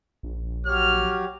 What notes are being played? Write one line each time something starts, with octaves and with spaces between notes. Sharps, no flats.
A#1
F#3 G4 C#5 F6